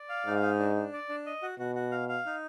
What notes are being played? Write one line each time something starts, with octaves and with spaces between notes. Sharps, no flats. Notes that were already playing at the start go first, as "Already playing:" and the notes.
Already playing: D5
F5
G#2 D#4
D#4
D4
D4
D5
D4
D#5
F#4
B2 F#4
F#4
F5
F5
D#4